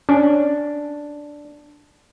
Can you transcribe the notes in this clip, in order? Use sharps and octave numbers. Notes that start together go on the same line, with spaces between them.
C#4 D4